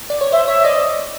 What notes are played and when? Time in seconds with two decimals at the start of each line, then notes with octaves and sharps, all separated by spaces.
0.10 D5
0.21 C#5
0.32 C5 E5
0.48 C#5 E5
0.64 D5 D#5